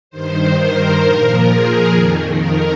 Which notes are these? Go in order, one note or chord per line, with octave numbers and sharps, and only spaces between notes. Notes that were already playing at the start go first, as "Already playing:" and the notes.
G2 D#3 C5
A#4
A#2 F3 A#4
G#4
F2 D#3
A#4